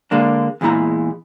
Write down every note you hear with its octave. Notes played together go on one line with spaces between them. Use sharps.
D3 G#3 A#3 D4
E2 A#2 G#3 E4 A#5